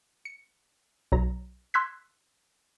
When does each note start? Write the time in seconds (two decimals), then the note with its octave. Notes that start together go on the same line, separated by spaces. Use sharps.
0.25 C#7
1.12 B1 F#3 A#5
1.74 C6 E6 F#6 G#6 B6